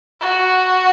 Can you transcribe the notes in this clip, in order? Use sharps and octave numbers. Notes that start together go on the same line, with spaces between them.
F#4